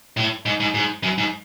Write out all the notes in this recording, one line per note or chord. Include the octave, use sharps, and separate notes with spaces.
A2
G#2
G#2
G#2
F#2
G#2